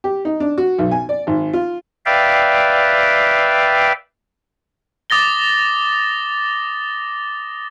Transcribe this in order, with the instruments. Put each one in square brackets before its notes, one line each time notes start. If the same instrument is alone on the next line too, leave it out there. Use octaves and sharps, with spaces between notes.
[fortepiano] G4
D#4
D4
F#4
B1
G#5
D5
G#1
F4
[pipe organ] B4 D5 E5 F5 G5
[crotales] D6 D#6 A6 A#6 G7